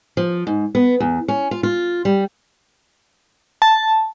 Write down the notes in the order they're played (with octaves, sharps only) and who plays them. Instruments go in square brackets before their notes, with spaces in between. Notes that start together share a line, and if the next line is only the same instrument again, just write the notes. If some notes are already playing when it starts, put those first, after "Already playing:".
[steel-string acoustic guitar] F3
G#2
B3
E2
C#4
F4
F4
G3
[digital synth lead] A5